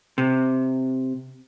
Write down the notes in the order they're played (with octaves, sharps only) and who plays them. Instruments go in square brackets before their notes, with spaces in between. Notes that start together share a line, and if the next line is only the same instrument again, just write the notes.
[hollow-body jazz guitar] C3